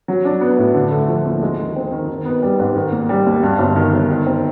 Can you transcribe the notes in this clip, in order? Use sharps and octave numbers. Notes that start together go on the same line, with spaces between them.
F#3
D4
B3
A2
D3
A3
F3
D#2
G#3
D#3
C4
D#3
D#3
B3
G3
G#2
D#3
A#3
G3
D#2
G2
G1
D#3
G1
D#3
C4